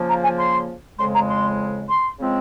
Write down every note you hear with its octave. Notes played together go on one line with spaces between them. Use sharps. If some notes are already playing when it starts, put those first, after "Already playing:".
Already playing: C#3 F3 A#3
A#5
G#5
C6
F2 C#3 G#3 C6
A#5
C6
C6
C#3 F3 G#3 C4